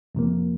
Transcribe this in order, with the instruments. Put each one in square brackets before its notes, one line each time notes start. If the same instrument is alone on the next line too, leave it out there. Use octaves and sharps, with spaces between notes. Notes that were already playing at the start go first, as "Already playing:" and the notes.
[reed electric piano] F2 C3 F3 A#3